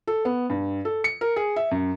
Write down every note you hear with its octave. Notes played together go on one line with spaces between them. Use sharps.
A4
B3
G2
A4
C#7
A#4
G#4
E5
F#2